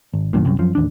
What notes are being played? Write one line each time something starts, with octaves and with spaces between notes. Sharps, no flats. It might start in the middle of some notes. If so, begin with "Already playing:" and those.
G#1
F#1 E2 G2 A#2
C2 F#2
F#2 F3
A1 D#2 D4